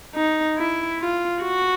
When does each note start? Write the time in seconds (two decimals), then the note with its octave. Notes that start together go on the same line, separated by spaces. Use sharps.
0.16 D#4
0.58 E4
1.00 F4
1.42 F#4